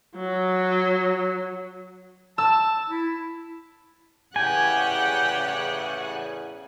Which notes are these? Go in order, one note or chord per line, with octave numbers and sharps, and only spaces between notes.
F#3
A5 E6
E4
E2 A2 C#3 G4 F#5 G#5